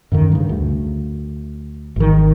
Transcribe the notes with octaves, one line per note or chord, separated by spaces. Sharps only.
F#2 D3 D#3
G2 C#3
D2
G#1 D#3